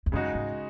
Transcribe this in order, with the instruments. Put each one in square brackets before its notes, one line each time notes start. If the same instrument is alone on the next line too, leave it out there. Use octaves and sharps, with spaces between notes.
[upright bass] E2
[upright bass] F#2 [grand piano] C#3 G#3 D#4 F#4
[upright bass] G#2